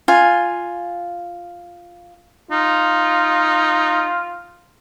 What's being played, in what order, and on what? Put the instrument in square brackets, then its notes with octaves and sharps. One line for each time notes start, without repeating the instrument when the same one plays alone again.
[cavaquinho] F4 G#5
[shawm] D#4 [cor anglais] F4